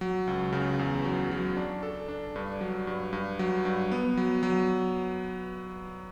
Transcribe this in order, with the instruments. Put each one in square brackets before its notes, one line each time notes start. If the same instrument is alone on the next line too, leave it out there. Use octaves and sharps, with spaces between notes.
[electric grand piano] F#3
C#2
C#3
E2
F#3
F#3
D4
A4
D4
G2
F#3
G2
G2
F#3
G2
B3
F#3
F#3